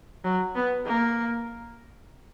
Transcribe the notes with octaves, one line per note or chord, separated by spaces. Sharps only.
F#3
B3
A#3